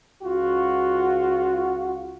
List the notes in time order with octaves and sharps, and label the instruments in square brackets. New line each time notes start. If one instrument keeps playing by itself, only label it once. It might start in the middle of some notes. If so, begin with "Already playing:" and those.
[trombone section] C#2 F4 F#4